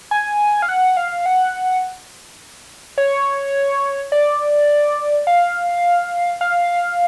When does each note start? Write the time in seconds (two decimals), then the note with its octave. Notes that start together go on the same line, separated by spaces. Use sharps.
0.11 G#5
0.62 F5
0.69 F#5
0.97 F5
1.26 F#5
2.98 C#5
4.12 D5
5.27 F5
6.41 F5